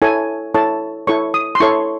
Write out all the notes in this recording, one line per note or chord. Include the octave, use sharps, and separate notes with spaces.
E4 A4 C#5 G#5
E4 A4 C#5 A5
E4 A4 C#5 C#6
D#6
C6
E4 A4 C#5 C#6